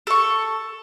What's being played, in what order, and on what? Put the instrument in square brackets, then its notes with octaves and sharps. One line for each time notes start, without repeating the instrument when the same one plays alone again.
[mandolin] A4 C#6